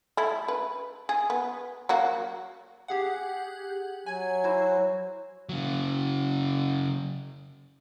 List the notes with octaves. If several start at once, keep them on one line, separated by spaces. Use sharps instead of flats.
A3 E4
B4
G#4
B3
F#3 A#3 F#4
G4 G#4 F#5
F#3 G#5 G#6
E4 F#4 C5
C#3 F#3